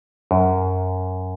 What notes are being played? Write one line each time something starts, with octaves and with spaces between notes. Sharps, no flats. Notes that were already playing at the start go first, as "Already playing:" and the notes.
F#2